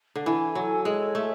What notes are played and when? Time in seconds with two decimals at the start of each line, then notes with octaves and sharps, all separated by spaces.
0.16 D3
0.26 E3 G#5
0.55 F#3 A4
0.85 G#3 C#5
1.15 A3 E5